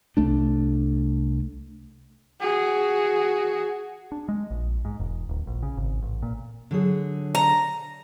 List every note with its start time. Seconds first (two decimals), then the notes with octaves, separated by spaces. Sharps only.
0.17 C2 A3 D4
2.40 F#4 G#4
4.12 D4
4.29 G#3
4.51 A#1
4.85 G#2
5.00 E1
5.29 D1
5.47 A#1
5.63 C#3
5.77 G#1
6.03 A1
6.23 A#2
6.71 D3 F#3 G#4
7.35 A#5